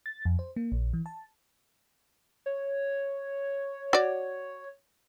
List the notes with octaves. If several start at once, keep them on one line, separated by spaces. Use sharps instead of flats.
A6
F2
C5
A#3
A#1
E3
A5
C#5
F#4 D5